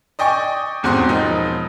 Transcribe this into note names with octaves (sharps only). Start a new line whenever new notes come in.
D5 D#5 G5 G#5 C#6
D#1 E2 G#2 C4 F#4 C6
E1 F3 D#4